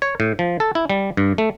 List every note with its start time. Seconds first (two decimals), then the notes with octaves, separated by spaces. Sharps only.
0.02 C#5
0.20 A2
0.39 F3
0.60 A4
0.75 E4
0.90 G3
1.17 G2
1.38 A3